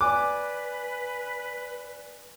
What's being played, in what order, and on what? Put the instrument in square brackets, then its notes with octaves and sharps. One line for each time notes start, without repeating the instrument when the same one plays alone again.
[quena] B4 [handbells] D5 G#5 F#6 [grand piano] D6